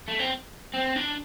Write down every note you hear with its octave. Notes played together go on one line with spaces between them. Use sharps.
A3
C4
C4
D4